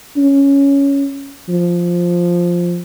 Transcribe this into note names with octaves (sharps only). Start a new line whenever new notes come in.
C#4
F3